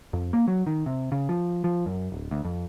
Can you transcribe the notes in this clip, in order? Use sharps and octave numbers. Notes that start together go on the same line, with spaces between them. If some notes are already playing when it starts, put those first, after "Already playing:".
F2
A#3
F#3
D#3
C3
C#3
F3
F3
F#2
D1
D2
F2